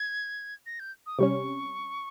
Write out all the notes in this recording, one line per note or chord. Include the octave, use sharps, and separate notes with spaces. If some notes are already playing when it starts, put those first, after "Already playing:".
Already playing: G#6
A#6
G6
D#6
C3 G3 C#4 C#6